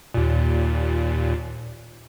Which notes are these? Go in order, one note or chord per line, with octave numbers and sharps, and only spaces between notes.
D#2 A#2